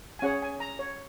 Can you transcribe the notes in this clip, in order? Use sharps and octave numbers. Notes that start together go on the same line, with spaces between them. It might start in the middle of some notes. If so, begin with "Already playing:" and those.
G#5
C#4 G#4 C#5 F#5
G#5
A#5
C#5